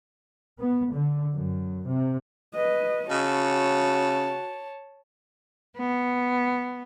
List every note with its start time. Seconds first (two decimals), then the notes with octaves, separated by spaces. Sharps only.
0.60 B3
0.93 D3
1.33 F#2
1.86 C3
2.54 B4 D#5
3.10 C#3 F#4 C#5 A5
5.78 B3